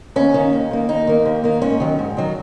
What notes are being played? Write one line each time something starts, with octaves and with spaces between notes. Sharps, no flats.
D#2 C#4
D#3 A#3
D#2
D#3 A#3
D#2 D#4
D#3 A#3
D#2
D#3 A#3
G#2 C#4
D#3 F#3
G#2
D#3 F#3